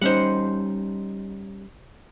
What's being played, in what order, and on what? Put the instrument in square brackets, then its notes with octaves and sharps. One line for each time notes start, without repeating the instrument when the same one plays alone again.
[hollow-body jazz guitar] G3 C#4 D#4 [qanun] C5 F#5